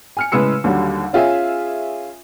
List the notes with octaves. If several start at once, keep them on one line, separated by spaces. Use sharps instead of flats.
G#5 F6 C#7
A2 C#3 G#3 B4 E6 C#7
D#2 D3 F#3 G3
C#4 F4 G#4 E5 G#5